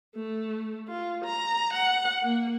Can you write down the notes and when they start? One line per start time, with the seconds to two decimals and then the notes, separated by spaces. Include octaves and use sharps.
0.15 A3
0.88 F4
1.25 A#5
1.73 F#5
2.23 A#3